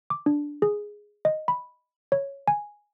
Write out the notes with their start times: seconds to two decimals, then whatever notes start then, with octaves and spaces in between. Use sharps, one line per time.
0.10 D6
0.26 D4
0.62 G#4
1.25 D#5
1.48 B5
2.12 C#5
2.48 G#5